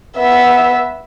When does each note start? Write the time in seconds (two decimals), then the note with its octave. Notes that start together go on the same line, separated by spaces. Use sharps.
0.18 B3 E5